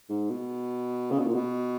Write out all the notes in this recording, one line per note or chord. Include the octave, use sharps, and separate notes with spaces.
G#2
B2
C#3
B2
A#2
B2